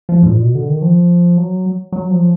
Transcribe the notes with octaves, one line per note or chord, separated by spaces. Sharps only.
F3
G#2
A#2
B2
D3
D#3
F3
F#3
F#3
F3